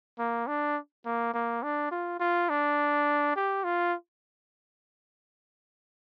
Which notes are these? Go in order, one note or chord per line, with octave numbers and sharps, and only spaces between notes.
A#3
D4
A#3
A#3
D4
F4
F4
D4
G4
F4